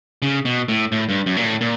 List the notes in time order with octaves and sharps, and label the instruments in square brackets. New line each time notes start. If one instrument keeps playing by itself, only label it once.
[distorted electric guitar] C#3
B2
A2
A2
G2
F#2
A#2
A2
A#2